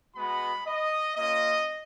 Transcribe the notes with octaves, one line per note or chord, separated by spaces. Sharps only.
G#3 B3 F#4 B5
D#5
A#3 C#4 F4 D#5